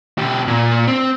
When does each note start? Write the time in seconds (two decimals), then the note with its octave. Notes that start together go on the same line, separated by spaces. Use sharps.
0.18 B2 G4
0.48 A#2
0.87 C4